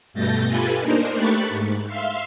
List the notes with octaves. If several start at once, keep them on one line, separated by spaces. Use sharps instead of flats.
G2 B2 A3 G6 A6 A#6
F4 G4 A4 B4 G#5 B5
A#3 D4 D#4 A#4 C5
A3 G4 B5 C#6 F#6 A6
G#2
E5 F5 C6